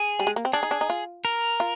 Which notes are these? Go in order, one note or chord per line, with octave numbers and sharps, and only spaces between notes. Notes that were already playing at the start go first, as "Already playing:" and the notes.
Already playing: G#4
G3
G#3
A#3
C4
D4 G#4
D#4
D4
D#4
F4
A#4
F4